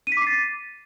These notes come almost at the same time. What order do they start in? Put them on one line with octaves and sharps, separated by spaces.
D#7 B6 D6 C7 A6